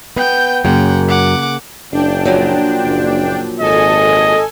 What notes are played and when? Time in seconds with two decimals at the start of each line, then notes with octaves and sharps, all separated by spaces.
0.17 B3 G5 G6
0.65 F#2 C#3 A#3 F#5 G5
1.08 F#5 D6
1.92 F#1 D4 G5
2.25 A#2 F3 F#3
2.84 F#1
3.60 G#1 A4 D#5 G#5